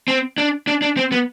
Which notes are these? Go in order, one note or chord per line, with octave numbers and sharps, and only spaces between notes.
C4
D4
D4
D4
C4
B3